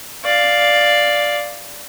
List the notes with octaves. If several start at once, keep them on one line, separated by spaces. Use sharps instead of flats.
D5 F5